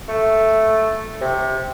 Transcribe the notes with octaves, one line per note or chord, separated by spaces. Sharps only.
A3
C3